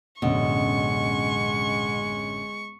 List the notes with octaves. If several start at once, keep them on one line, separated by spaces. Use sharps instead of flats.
A1 F#2 B2 D3 G#3 C#6